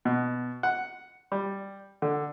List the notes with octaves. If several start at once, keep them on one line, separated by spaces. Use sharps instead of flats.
B2
F#5
G3
D3